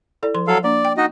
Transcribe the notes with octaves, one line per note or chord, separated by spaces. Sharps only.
E4 A4 D5
F3 C6
F#3 A4 F5
A#3 D4 D5
G5
D#4 F#4 D#5